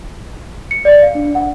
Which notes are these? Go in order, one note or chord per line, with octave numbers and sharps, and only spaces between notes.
C#7
D5
F5
D4
F#5